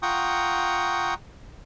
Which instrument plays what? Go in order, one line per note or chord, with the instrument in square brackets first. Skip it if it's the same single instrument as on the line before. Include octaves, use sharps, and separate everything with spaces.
[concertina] F4 F#5 G5 A#5 C#6 D#6